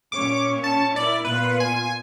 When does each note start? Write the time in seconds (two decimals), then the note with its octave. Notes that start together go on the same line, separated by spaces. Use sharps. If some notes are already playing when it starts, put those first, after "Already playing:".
0.12 A#2 C#4 C#5 D6
0.64 A5
0.96 E4 A#4 D5
1.25 A#2 B3 F4 B4
1.60 G#5